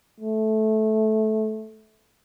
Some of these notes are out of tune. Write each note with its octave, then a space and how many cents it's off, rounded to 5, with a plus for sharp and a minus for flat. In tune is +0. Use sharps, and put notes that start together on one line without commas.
A3 -15